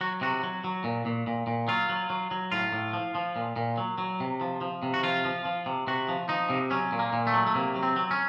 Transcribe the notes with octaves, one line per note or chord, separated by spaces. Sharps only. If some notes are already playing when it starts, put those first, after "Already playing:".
F#3 F#4
C3 F#4
F#3
F#3
A#2
A#2
A#2
A#2
F#3 F4
F#3
F#3
F#3
A2 F4
A2
F3
F3
A#2
A#2
F#3
F#3
C3
F3
F3
C3
F#4
F3 F4
F3
F3
C3
C3 F#4
F3
F3 D#4
C3
F#3 C#4
A#2
A#3
A#2
A3
F#3
A3
C3 A#3
F#3
C4
F#3
C#4